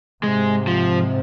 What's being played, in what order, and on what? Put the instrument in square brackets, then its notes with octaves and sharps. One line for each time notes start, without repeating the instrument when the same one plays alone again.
[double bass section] G#2 C3 [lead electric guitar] G#3
[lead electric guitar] F3